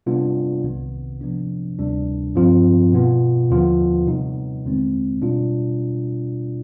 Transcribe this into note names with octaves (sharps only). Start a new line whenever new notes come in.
C3 G3 B3 D4 F4
C2 C3 D#3 B3
C3 F3 B3 D4
D2 C3 G3 D4
G2 F3 C4 F4
B2 B3 F4
D#2 D3 F3 B3 F4
C3 G3 B3 D#4
D#2 D3 G#3 C4
B2 G3 D4 F4